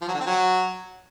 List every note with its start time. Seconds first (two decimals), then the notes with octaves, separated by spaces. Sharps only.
0.02 F3
0.08 F#3
0.14 D3
0.20 C4
0.27 F#3